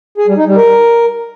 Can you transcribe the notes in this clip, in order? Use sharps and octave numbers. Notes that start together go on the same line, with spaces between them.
G#4
G3
D#4
G3
A#4